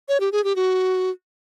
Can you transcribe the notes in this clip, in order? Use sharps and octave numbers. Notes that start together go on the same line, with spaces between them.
C#5
G4
G#4
G4
F#4